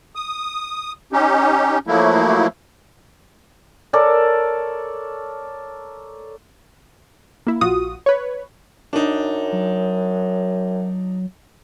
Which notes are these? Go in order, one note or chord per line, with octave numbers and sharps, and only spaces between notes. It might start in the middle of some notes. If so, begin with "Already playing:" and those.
D#6
C#4 D#4 G4
F3 F#3 A3 A#3 E4
A4 A#4 C#5 D5
A#3 E4
A#1 F4 F#4 D#6
B4 C#5
F#2 D4 D#4
F#3